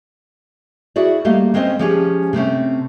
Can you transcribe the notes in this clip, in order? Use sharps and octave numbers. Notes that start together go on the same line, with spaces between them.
E4 F#4 G#4 D5
G3 A3 A#3 D#5 F5
G#3 C4 C#4 C5 D#5
F3 G#3 C#4 G4 G#4
C3 A3 C4 C#4